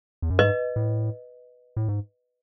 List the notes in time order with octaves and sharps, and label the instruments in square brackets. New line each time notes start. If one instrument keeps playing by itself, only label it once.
[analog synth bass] E2
F#2
[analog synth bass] G#2 [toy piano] B4 D#5
[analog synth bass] A2
A2
G#2